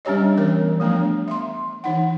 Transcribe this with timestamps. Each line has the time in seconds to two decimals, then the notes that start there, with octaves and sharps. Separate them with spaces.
0.05 G3 C#4 D4 G4 C#5 D#5
0.37 E3 B3 A#4 C#5
0.80 F3 A3 B3 D4
1.28 E5 C6
1.84 E3 D#4 F#5